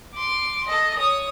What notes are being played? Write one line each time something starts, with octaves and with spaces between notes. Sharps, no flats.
C6 D6
A4 D#5
C#5 D#6